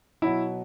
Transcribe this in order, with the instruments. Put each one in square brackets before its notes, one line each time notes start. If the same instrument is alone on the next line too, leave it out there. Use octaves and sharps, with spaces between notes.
[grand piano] B2 F#3 E4